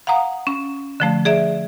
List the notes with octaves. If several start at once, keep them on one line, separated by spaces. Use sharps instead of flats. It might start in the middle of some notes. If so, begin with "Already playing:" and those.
F5 F#5 A#5 D#6
C#4
D3 F3 A3
G#4 D5 E5